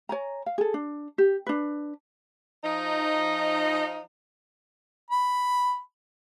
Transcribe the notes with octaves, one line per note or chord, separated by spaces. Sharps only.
C#5 G#5 A#5
F5
G#4 A4
D4
G4
D4 B4
F3 D#4
B5